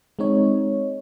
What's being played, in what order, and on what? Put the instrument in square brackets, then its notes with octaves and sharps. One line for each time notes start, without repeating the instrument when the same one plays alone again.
[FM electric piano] G#3 C4 D#4 C#5